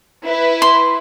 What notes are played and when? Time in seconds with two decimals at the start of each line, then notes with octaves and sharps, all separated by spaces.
0.25 E4 B4
0.62 C6